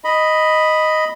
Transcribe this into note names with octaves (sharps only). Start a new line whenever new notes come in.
D#5 B5